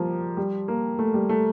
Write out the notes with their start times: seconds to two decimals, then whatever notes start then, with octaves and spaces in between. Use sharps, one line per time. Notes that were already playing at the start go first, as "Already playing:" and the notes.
Already playing: F3 G3 A#3
0.37 G3
0.68 A#3
0.99 A3
1.14 G3
1.29 A3